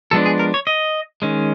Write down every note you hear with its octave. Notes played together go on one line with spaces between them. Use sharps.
F3 G#3 B3 D4 A4
G#4
A#4
C#5
D#5
D#3 G#3 C#4